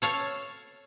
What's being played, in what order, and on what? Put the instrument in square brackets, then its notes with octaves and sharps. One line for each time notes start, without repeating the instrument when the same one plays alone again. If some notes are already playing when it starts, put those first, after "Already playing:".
[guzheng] A4 C#5 F5